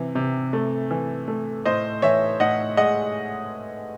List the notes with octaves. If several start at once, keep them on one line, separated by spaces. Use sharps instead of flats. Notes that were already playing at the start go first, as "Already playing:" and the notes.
Already playing: C3 E3
C3
A3
E3
A3
A2 C5 D#5
E3 C#5 E5
A2 D#5 F#5
G#3 D#5 F#5